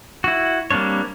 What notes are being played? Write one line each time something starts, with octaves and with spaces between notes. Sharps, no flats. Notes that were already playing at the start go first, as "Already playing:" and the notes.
E4 F#4
G3 A#3 C4 D4 C#5